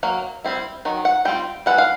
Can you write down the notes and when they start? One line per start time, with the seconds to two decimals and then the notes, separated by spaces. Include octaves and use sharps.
0.03 F#3 A#3
0.44 G3 C4 E4
0.85 D#3 F#3
1.05 F#5
1.25 G3 C4 F4 G5
1.66 E3 G3 F#5
1.78 F5